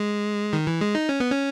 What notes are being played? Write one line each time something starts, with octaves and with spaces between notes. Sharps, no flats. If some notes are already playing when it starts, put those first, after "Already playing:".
Already playing: G#3
D#3
E3
G#3
D#4
C#4
B3
C#4